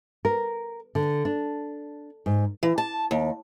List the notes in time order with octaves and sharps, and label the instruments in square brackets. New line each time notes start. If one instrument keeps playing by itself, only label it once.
[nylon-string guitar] A#4
D3
D4
G#2
[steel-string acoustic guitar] E3
A5
D#2